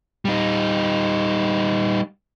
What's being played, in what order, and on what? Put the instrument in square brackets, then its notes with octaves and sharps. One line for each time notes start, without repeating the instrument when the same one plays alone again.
[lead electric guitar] G3 D#4